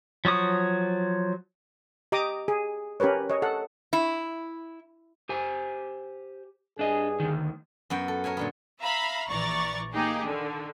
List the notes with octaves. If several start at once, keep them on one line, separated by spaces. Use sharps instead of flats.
F3 F#3 C#6 D#6
G4 D#5 A#5 D6 D#6
G#4
C#4 G4 A#4 B4 C#5
C#5 D#5
A4 F#5
E4
G4 C5 G#5
G2 D4 G#4 D#5
D2 D#3
F#2 B3 F#4 G5
A4
A#4 C#5 E5 G#5
A#2 D3 B3
E5 F5 A#5 B5
A#1 E3 D5 A#5 C#6 A6
A#3 D#4 G4 G#4
D3 D#3